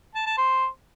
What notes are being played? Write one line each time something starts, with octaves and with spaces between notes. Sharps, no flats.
A5
A5
C5